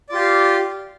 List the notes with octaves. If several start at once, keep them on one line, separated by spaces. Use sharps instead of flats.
F4 G4 D5 F5